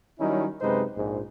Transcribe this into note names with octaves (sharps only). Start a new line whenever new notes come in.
D#3 F#3 G3 C#4 D#4 E4
F#2 C3 G#3 D#4 B4 C5
A#1 G#2